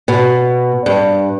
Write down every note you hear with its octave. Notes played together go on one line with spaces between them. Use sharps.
B2
G2